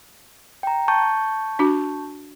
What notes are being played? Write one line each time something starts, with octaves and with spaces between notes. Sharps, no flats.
G5 A#5
A5 C#6 G6
D4 F#4